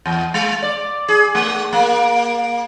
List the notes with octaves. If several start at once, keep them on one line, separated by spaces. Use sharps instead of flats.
E2
G#3
D5
G#4
A3
A#3